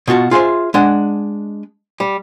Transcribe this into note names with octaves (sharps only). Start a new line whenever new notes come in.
B2 F4 F#4 A5
F4 G#4 C5 E5
G#3 D4 F#5
G3